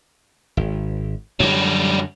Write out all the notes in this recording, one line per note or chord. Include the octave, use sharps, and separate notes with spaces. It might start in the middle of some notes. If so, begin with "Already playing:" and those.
G#1
F#2 D3 F#3 G3